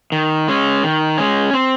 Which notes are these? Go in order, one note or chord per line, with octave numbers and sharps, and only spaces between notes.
D#3
G#3 C#4
D#3
G#3 C#4
C4